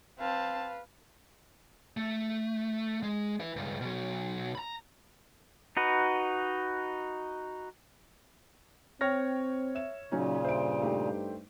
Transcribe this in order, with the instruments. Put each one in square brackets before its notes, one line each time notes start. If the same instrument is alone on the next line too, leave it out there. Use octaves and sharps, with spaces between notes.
[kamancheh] C4 A5 [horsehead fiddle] B4 F5
[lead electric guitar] A3
G#3
E4 B4
C#2 G2
B2 F#3
A#5 B5
[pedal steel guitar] D#4 F#4 B4
[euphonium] C4 [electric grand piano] C#5 F6 A#6 [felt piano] G5
[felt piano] E5 E7
[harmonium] A#2 C#3 [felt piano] F#3 C#4 D#4
[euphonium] G2 [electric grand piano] C5 [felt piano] E5 D7
[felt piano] A3 D#4 G4